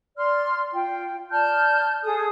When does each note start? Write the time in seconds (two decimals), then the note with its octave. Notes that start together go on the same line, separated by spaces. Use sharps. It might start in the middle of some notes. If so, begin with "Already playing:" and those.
0.16 D5 C6 F6
0.73 F4 G5
1.31 D5 A5 F6 G6
2.03 G#4 A4 D#6